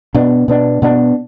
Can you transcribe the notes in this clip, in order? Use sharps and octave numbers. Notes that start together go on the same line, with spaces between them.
B2 B3 D4
B2 B3 D4
B2 B3 D4